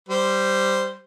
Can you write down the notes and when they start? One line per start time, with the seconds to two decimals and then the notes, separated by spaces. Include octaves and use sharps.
0.09 G3 C5